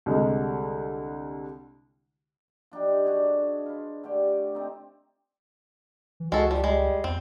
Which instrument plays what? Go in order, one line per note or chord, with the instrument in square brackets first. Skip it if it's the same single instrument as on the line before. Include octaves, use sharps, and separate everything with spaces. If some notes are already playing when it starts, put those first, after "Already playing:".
[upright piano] C2 D3 G3 G#3
[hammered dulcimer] F3 D4 D#4 G4
D4 F#4 G#4
F4 B4
D3 A3 G4 G5
C4 D#4
[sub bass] E3
[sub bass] C#2 [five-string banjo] G#3 A4 [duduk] F#4
[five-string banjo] F3 [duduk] G3
[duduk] G3 [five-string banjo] G#3
[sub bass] E2 [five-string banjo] C4